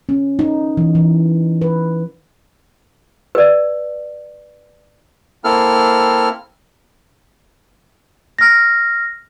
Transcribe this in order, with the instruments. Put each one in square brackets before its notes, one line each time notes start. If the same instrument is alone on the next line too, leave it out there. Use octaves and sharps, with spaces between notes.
[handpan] C#4
D#4
E3
E3
B4
[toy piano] B4 D5
[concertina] A#3 C4 E4 A4 F6
[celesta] F6 A#6